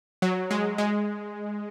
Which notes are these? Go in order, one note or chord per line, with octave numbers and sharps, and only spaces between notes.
F#3
G#3
G#3